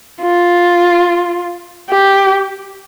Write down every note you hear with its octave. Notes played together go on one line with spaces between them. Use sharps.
F4
G4